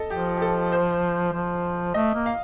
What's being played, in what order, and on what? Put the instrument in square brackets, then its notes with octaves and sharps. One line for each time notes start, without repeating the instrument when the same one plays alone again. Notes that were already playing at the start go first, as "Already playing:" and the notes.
Already playing: [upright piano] A4 D#5
[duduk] F3 [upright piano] G4
[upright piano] G4
A4
C5
[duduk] F3
[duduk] A3 [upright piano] D#5
[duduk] A#3
[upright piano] F5